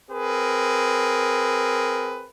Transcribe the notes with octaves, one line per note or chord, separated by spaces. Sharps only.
C4 G#4 A#4 B4